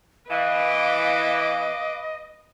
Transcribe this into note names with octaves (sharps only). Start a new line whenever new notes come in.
E3 B4 D#5 F5 D6